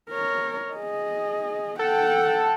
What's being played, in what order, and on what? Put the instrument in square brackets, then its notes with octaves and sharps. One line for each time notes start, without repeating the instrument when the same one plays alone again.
[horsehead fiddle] A#4 C#5
G#4 D#5
[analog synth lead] A4 [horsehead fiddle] F#5 G5